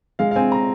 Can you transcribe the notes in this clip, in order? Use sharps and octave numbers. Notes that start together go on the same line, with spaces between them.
G#3 F5
F5
C4 G#5
A#5